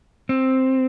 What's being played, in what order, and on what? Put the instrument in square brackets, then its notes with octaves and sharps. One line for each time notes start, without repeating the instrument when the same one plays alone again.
[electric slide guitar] C4